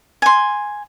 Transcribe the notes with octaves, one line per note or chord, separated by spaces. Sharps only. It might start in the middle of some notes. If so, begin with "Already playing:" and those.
G#5 C6